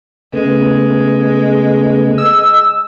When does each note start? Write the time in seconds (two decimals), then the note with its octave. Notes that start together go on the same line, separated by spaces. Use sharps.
0.33 C#3 G#3 A3 B3
2.18 D#5 E6